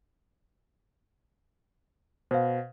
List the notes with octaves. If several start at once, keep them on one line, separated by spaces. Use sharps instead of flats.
B2 C5 F5